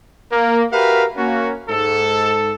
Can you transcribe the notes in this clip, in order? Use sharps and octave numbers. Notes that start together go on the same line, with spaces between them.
A#3
F#4 G4 A#4 B4 E5 F5
A#3 C#4 F#4
G#2 A4